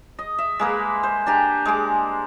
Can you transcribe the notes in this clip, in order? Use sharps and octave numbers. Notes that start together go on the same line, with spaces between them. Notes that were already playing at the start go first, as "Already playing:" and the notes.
D#5
E5
G#3 A#3 B4
C5
D4 G4 G#5 A#5
G#3 D6